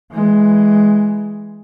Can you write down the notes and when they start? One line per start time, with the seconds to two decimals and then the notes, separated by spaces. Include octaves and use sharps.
0.13 E3 G#3